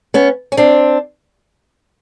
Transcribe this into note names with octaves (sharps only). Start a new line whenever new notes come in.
B3 C#4
C#4
C4 D4